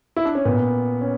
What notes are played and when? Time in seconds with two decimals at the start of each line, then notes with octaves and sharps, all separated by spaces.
0.16 E4
0.25 D4
0.35 C#4
0.45 A#2 B3
1.01 C#4